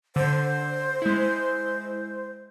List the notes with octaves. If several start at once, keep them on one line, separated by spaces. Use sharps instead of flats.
D3 C5
G#3 E4